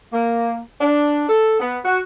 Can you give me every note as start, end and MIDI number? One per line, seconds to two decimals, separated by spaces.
0.12 0.59 58
0.81 1.24 62
1.29 1.60 69
1.60 1.78 59
1.84 1.98 66